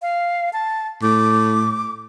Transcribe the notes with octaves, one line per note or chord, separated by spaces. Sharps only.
F5
A5
A2 D6